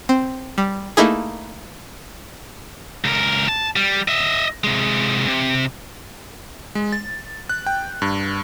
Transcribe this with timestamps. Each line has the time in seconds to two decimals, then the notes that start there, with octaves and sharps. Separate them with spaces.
0.09 C4
0.58 G3
0.97 A3 A#3 D#4 E4 G#4
3.04 C#2 A#4
3.48 A5
3.76 G3
4.08 D#5 E5
4.64 C3 G#3
5.27 C3
6.75 G#3
6.92 A6
7.49 F#6
7.66 G5
8.02 G2